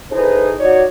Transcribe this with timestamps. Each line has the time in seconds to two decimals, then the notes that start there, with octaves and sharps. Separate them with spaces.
0.12 D#4 E4 G#4 A4 B4 C5
0.60 D#4 F#4 C#5 D5